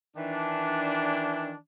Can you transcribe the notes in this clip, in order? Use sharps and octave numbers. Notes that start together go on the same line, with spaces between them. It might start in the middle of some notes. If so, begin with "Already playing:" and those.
D#3 E3 D4